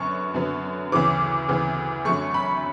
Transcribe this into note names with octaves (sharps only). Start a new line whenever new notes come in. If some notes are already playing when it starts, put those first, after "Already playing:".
Already playing: F#2 D3 F#3 B3 C#6
F#2 D3 F#3 B3
D2 C#3 E3 B3 D6
D2 C#3 E3 B3
F#2 D3 F#3 A3 C#6
B5